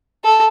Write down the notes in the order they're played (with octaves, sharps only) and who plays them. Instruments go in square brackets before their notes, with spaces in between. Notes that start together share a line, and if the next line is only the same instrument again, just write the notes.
[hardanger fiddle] A4